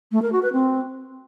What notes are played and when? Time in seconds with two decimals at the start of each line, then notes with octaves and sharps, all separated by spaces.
0.12 A3
0.22 A#4
0.32 F#4
0.43 B4
0.53 C4